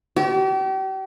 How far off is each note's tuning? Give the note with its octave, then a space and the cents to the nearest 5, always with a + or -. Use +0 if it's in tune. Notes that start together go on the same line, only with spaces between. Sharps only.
G4 -40